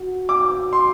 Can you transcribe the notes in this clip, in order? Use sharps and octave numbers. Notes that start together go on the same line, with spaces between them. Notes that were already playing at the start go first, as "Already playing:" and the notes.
Already playing: F#4
D6
C6